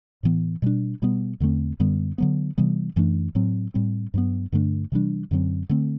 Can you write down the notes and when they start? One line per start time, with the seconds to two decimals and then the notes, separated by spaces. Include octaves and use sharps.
0.23 A2 E3 B3
0.62 B2 G3 D4
1.02 B2 G3 B3
1.40 E2 D3 A3 C4
1.80 F#2 D3 G3 B3
2.18 D3 F#3 B3
2.58 C3 E3 G3 B3
2.96 F#2 E3 A3 D4
3.35 A2 F#3 C4
3.74 A2 G3 C4
4.14 G2 F#3 B3
4.52 G2 D3 A3 D4
4.92 C3 E3 G3 D4
5.31 F#2 D3 F#3 C4
5.69 D3 A3 C4